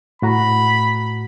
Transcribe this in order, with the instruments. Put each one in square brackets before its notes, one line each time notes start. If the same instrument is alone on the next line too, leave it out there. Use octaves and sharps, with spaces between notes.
[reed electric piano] A2 F#4 A#5 [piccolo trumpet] B5